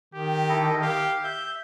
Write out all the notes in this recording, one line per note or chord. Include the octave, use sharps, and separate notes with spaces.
D#3 G4
E4 A4 D#5
G4 F5
E5 G6